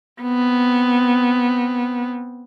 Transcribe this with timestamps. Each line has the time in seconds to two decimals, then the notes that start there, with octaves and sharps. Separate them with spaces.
0.22 B3 C4